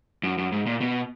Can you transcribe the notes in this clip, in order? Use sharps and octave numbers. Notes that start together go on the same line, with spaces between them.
F#2
F#2
G#2
A#2
B2